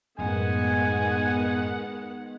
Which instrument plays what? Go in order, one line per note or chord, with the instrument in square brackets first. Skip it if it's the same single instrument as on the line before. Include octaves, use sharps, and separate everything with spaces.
[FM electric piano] F#2 A2 [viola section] D#3 B3 F#5 [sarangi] G#3 [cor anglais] G#5